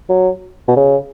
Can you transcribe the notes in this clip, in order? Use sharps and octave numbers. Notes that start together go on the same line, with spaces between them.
F#3
B2
C#3